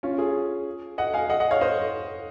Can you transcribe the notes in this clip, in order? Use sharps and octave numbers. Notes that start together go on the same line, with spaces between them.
C#4 F4
F4 G#4
D#5 F#5
F5 G#5
D#5 F#5
D#5 F#5
C#5 F5
C5 D#5